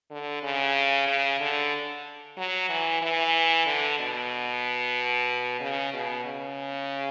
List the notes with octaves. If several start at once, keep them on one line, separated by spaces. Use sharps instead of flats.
D3
C#3
C#3
D3
F#3
E3
E3
D3
B2
C#3
B2
C#3